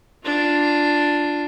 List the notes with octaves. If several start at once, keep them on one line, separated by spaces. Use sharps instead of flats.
D4 F4